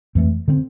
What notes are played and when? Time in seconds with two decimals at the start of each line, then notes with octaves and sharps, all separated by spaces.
0.15 F2 E3 A3
0.48 D3 A3 C4